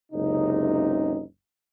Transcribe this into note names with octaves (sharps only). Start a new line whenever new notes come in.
F#1 C#2 C3 D#4